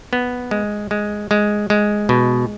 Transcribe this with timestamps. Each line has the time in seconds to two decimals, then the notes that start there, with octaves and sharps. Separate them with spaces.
0.13 B3
0.51 G#3
0.91 G#3
1.31 G#3
1.70 G#3
2.09 B2